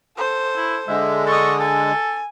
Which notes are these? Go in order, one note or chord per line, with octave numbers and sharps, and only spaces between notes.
A4 C5
E4
D3 G#3 E5
A4 D#5 C#6
A4 G#5